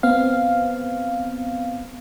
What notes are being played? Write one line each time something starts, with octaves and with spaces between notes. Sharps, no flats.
B3 C4 F5